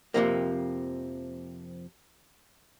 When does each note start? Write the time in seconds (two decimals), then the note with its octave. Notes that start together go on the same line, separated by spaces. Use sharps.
0.14 F2 C3 F3 A#3